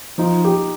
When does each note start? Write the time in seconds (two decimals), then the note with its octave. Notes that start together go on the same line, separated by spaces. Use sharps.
0.18 F3 D#4 F4
0.45 G4